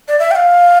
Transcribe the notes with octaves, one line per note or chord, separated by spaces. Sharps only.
D5
E5
G5
F5